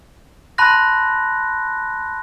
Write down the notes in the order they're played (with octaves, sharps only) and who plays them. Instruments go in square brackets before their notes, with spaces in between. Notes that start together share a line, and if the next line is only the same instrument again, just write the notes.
[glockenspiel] A5 B5 C6 F#6 A#6